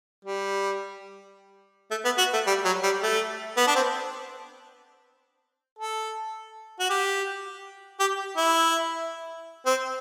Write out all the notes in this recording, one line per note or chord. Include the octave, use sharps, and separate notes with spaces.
G3
A3
B3
F#4
A3
G3
F#3
G3
A3
B3
D4
C4
A4
F#4
G4
G4
E4
C4